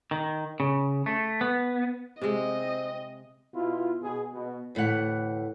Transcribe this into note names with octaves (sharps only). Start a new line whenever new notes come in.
D#3
C#3
A3
B3
C3 G#3 C4 D#5
B2 E4 F4
B2 G#4
B2
D2 A2 E3 F#5